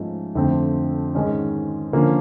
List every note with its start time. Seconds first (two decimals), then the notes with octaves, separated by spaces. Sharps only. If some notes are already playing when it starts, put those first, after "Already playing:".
Already playing: G#2 F3 A3 C#4
0.35 F2 D3 F3 A3 C4
1.15 G#2 D#3 G#3 C#4
1.93 D3 F3 A#3 C#4